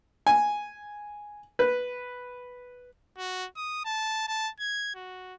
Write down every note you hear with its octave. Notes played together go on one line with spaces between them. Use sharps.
G#5
B4
F#4
D#6
A5
A5
G#6
F#4